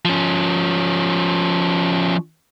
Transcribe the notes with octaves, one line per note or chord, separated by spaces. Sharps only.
F3 C#4